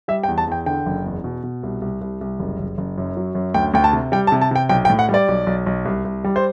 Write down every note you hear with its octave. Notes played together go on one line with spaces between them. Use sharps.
G3 E5
G5
E2
A5
E2 G5
D3 G5
F#1
E2
B2
B2
C2
C2
C2
C2
F#1
F#1
F#1
F#2
F#3
F#2
D2 G5
D2 G5
A5
C3
G3 G5
A5
C3
A5
C3 G5
B1 G5
G5
A2
F#5
G3
D5
B1
B1
B1
C2
C2
G3
C5